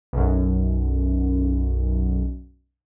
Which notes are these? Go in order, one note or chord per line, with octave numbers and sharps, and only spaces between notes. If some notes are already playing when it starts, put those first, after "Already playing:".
B1 F#2